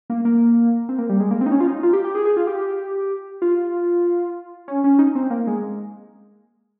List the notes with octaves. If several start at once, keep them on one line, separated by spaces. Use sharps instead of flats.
A#3
A#3
C4
A#3
G3
G#3
A#3
C4
D#4
C#4
F4
D#4
F4
G4
G4
G#4
G#4
F4
G4
F4
C#4
C#4
D#4
C4
A#3
G#3